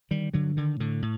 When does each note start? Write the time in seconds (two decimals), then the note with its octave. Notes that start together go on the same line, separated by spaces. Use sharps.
0.11 D3 D#3 G3
0.34 G2 D3 F#3
0.57 D3 D#3
0.80 A2 D3
1.02 A2